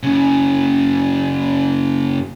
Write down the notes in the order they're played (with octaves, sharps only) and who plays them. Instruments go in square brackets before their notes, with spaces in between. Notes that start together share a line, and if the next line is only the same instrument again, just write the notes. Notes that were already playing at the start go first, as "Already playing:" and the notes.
[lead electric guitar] F#2 C#3